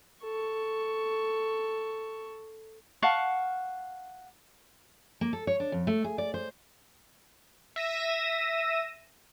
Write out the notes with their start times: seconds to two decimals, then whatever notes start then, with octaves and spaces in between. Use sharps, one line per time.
0.23 A4 C#6
3.02 F5 F#5 A5 C#6
5.21 A#3
5.33 A4
5.47 C#5
5.60 D4
5.72 F2
5.87 A3
6.04 G#4
6.18 D5
6.34 C5
7.76 E5 A#6 D#7 E7